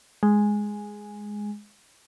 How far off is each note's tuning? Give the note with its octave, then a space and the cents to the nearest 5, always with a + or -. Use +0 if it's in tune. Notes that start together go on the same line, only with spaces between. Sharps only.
G#3 +0